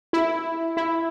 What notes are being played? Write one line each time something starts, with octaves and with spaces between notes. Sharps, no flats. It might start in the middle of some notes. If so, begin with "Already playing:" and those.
E4
E4